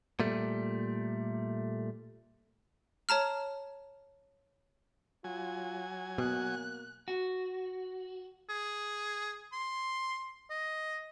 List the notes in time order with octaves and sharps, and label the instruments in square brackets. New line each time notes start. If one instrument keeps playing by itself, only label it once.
[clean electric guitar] A#2 G3 A3
[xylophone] C#5 A5 A#5 F6
[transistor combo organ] F#3 G#5 [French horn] F4
[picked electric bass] B2 [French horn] A#3 [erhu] F#6
[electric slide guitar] F#4
[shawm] G#4
C6
D#5